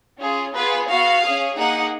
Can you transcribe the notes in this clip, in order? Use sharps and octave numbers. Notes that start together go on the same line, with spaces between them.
C#4 F4 G#4
B3 F4 G#4 B4
B3 F#4 F5
C#4 G#4
A#3 D#4 G#4 F#5